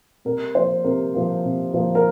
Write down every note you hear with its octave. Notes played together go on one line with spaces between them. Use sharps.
C3 A#4
F3 A#3 C5
C3 A#4
F3 A#3
C3
F3 A#3
A#4